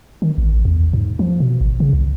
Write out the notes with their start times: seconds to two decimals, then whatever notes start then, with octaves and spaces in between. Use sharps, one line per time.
0.22 D#3
0.38 A1
0.65 E2
0.93 G#2
1.19 F3
1.40 B2
1.61 G#1
1.80 C#3
1.93 C2